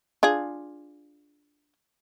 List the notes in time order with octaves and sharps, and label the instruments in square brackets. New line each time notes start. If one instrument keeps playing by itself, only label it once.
[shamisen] D4 F4 G#4